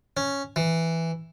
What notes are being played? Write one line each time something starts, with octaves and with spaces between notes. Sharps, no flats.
C#4
E3